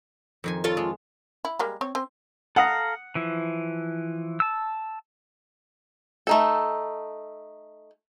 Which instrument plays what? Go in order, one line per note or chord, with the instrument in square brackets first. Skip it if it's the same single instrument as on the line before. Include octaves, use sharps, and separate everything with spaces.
[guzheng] F2 D#3 G#5
[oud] F4 A4 C#5
[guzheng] G#3
[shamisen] E4
G3 G#3 A#3
C4 C#5
C4 C5
[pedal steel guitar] A4 F5 A#5 [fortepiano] F#5 D#6
[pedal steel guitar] E3 F3 E4
A5 E6
[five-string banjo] A3 D#4 A4